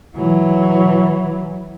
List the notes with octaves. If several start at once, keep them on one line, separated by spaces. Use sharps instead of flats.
E3 F#3